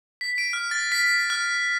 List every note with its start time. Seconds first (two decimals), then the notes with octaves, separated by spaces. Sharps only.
0.21 B6
0.38 D7
0.53 F6
0.71 A6
0.92 B6
1.30 F6